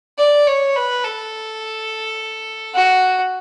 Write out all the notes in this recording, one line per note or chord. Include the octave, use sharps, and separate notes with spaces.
D5
C#5
B4
A4
F#4